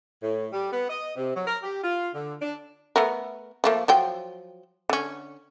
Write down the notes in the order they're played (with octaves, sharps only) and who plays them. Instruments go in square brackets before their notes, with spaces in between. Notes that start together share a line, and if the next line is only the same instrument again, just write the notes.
[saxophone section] A2
G3
B3
D#5
C3
F#3
A#4
G4
F4
D3
D4
[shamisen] A3 B3 A#4
F3 A3 A#3
F3 F#3 G5
D3 C#4